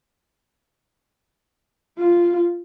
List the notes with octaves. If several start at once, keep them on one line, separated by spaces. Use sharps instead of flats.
F4